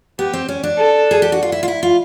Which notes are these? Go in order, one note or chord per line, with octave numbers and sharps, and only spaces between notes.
B3 G4
C4
C#4
D4
A4
G#4
G4
F#4
F4
E4
F4
E4
F4